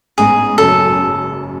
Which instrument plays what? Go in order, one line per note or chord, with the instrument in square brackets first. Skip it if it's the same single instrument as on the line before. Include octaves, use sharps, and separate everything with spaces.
[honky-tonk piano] A1 G#2 G#3 B3 [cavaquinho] G#4
[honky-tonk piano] F#1 F#2 C#3 F#3 [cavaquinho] A4